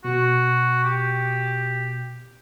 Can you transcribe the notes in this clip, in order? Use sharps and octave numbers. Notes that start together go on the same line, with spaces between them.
B2 F#4
G4